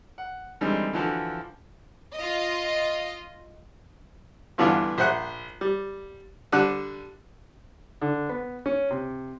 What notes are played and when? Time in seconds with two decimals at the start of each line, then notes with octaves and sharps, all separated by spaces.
0.18 F#5
0.61 D3 E3 G3 G#3 C4 D#4
0.93 D3 E3 F3 F#4 A4
2.17 F4 D#5
4.58 G2 D3 E3 B3 D4 F4
4.98 A#1 C5 E5 F#5 F#6
5.61 G3
6.52 D3 G3 D4 F#6
8.02 D3
8.29 B3
8.66 C#4
8.91 C3